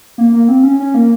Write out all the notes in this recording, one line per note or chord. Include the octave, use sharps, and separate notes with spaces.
A#3
A#3
C4
C#4
C#4
A#3